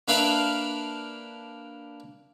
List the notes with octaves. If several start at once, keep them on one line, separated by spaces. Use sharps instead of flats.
A#3 D4 B4 E5 F5